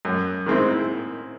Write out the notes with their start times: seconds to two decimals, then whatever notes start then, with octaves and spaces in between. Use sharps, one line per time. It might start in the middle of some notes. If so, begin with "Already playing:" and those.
0.05 F#2
0.46 D#3 G#3 C4 E4